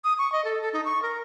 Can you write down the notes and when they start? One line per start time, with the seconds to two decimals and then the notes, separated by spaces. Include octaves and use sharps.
0.04 D#6
0.18 C#6
0.32 D#5
0.45 A4
0.62 A4
0.73 D#4
0.85 C#6
1.02 A#4